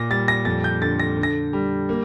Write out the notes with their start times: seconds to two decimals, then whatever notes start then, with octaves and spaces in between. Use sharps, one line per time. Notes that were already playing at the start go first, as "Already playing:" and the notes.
Already playing: A#2 A#6
0.10 G3 A6
0.28 A#6
0.45 F2 A6
0.64 G6
0.81 D3 A6
1.00 A#6
1.17 D3
1.23 A#6
1.53 G3
1.89 A#3